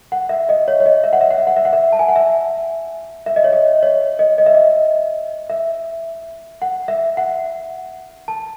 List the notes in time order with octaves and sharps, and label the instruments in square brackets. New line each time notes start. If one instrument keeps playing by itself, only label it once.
[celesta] F#5
E5
D#5
C#5
C#5
D#5
E5
F#5
E5
F#5
E5
F#5
E5
F#5
E5
A5
G#5
F#5
E5
E5
D#5
C#5
D#5
C#5
D#5
D#5
E5
D#5
E5
F#5
E5
F#5
A5